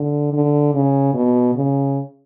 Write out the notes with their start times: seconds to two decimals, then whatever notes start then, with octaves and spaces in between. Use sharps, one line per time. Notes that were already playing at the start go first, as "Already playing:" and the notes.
Already playing: D3
0.33 D3
0.74 C#3
1.14 B2
1.55 C#3